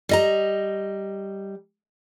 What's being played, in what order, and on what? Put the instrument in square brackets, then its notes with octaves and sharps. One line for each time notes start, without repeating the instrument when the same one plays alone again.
[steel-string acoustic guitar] G3 D#5 A#5